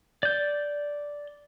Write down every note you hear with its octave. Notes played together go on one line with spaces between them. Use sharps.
D5 G6